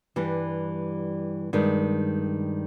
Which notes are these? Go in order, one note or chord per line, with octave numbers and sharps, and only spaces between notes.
G2 E3 G3
G2 D#3 G#3